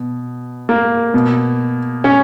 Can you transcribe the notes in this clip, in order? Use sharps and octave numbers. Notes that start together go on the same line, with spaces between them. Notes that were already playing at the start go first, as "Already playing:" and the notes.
Already playing: B2
A#3
B2
C#4